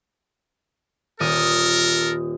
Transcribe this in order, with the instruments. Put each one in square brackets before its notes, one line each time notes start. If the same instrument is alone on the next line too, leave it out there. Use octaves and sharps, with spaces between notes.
[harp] D#1 D#6 [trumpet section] A4 A#4